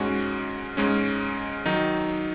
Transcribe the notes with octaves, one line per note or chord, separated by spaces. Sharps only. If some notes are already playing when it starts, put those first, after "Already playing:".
Already playing: G#2 G#3 C#4 F#4
G#2 G#3 C#4
D#3 F#3 D#4